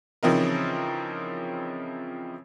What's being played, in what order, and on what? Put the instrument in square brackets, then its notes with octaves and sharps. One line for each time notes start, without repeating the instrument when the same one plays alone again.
[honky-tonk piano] C#3 E3 F3 C4 D#4 A#4